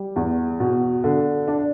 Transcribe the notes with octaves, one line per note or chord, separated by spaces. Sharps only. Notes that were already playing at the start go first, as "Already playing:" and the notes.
Already playing: G3
E2
B2
D3
D4